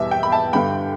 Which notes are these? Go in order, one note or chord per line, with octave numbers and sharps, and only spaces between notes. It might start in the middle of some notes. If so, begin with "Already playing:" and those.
Already playing: E2 B2 G3 E5
G5
B5
E5 A5
G2 D3 G3 G5 B5